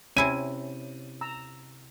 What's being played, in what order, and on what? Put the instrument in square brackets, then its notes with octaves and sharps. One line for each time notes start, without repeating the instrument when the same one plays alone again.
[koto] C3 E4 G#5 [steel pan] C#4 [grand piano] D#7
[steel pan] A#5 E6